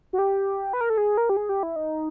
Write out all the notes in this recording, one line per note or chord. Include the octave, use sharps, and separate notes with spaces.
F#4
G4
B4
A#4
A4
G#4
A#4
G4
G#4
G4
E4
D#4